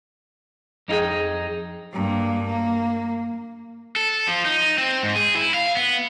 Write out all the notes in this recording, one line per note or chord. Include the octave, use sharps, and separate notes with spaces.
F2 D#4 F4 G#4 G5
G2 A#3
A#3
A4
F3
D#4
C4
G#2
G#4
E4
F5
B3